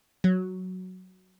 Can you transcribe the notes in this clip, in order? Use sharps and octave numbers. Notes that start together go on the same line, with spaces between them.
F#3